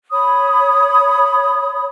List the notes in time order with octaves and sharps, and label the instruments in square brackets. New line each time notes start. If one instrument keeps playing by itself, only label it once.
[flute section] C#5 B5 D#6